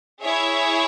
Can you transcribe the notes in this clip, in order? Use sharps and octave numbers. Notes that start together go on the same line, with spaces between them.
E4 G#4 C#5 E5